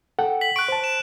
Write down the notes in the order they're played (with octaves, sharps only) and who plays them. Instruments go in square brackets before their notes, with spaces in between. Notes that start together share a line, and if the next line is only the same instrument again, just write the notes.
[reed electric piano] A4 F#5 G5
[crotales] B6 F#7
[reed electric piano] C#6 [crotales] F#6 B6 D7
[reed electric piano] C5 A5
[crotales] E7